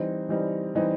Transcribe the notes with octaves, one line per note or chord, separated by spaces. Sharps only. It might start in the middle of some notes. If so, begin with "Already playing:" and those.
Already playing: E3 G3 C4 D#4
E3 G3 C4 D#4
E3 G3 C4 D#4